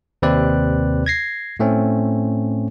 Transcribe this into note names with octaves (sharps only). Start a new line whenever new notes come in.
D#2 C3 C4 B4 D5 F#6
G#6 A#6 C7
A2 A3 C4 C#4